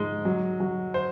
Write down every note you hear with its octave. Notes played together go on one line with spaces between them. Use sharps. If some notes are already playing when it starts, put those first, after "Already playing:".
Already playing: G#2 F3 G#3
F#3
F#3
C5